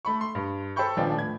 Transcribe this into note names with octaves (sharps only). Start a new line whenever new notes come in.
A3 B5 C#6
C6
G2
A4 C5 G5 B5 C#6 G6
D#1 F3 B3 D4 D5 G5
A2 G#6